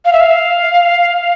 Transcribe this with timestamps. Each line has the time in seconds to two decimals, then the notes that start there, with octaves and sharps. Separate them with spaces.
0.05 F5
0.13 E5
0.20 F5